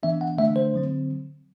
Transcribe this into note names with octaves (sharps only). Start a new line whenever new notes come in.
E3 B3 D4 E5
F#5
D3 A3 D4 E5
C5
D3 F#3 C4